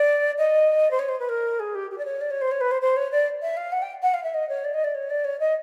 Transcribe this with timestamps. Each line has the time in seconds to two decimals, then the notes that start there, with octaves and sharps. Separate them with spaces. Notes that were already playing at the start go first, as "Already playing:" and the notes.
Already playing: D5
0.38 D#5
0.91 C5
0.99 C#5
1.09 C5
1.20 B4
1.29 A#4
1.59 G#4
1.75 G4
1.90 G4
1.98 D5
2.05 C#5
2.21 D5
2.30 C#5
2.41 C5
2.51 C#5
2.61 B4
2.71 C5
2.81 C5
2.96 C#5
3.12 D5
3.42 E5
3.57 F5
3.72 F#5
3.82 G5
4.02 F#5
4.14 F5
4.23 E5
4.34 D#5
4.49 C#5
4.64 D5
4.74 D#5
4.84 D5
4.95 C#5
5.10 D5
5.24 C#5
5.40 D#5